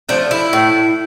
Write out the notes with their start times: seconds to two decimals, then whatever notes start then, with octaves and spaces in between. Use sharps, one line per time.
0.09 F3 A3 D4
0.31 E4
0.53 A2